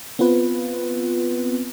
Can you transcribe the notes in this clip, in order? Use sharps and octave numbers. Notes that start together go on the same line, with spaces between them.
B3 C4 F4 B4